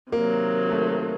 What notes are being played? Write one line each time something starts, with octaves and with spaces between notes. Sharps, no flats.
C3 D#3 F#3 A#3
A3